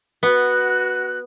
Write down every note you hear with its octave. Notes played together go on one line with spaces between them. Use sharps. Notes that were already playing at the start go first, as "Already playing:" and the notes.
B3 F#4 F#6